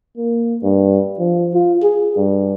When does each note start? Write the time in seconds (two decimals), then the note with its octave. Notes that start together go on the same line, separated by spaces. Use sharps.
0.17 A#3
0.63 G2
1.19 F3
1.54 F4
1.83 G#4
2.17 G2